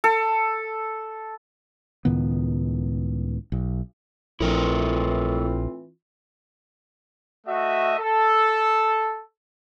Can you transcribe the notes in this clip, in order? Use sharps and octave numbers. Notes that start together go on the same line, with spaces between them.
A4
C#2 A2 D#3 B3
B1
A#1 A2 E3 C4 E4 F4 A#4 B4
A3 F#4 D#5 E5
A4